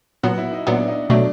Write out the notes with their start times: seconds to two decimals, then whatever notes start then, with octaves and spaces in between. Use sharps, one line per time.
0.23 A#2 F#3 B3 F#4
0.38 E4
0.52 D#4
0.67 A#2 F#3 B3 D4
0.88 D#4
1.10 B2 F#3 A3 D4